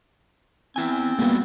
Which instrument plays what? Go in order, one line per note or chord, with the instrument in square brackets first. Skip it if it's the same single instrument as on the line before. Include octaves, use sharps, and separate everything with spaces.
[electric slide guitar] B3 E4 G#5 [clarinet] C4
[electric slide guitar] G3 F#4 G#4 [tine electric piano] A#3 B3